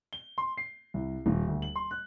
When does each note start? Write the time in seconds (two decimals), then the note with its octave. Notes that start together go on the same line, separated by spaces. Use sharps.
0.13 G7
0.38 C6
0.57 C7
0.94 C2
1.26 D#1
1.47 D2
1.62 F#7
1.76 C6
1.91 F#6